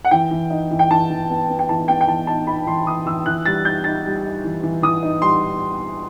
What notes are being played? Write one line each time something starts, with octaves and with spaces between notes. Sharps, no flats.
F#5
E3 G5
E3
D#4
E3
G5
E3 A5
E3
B3
B3
G5
E3 A5
B3 G5
G5
E3 A5
D#4 A5
D#4 B5
E3 C6
E3 D#6
E3 E6
E3 F#6
G3 A6
D#4 G6
D#4 A6
G3
D#4
E3
E3
E3 D#6
D#4
G3 C6